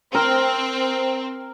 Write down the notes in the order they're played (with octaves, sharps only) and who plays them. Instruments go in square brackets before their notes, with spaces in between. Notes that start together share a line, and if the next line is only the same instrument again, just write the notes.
[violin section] C4 [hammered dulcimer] A#4